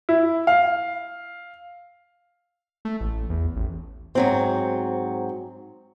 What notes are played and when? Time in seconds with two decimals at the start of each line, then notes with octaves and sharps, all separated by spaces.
0.09 E4
0.47 F5
2.85 A3
3.01 A1
3.30 E2
3.56 A1
4.15 G#2 F#3 C4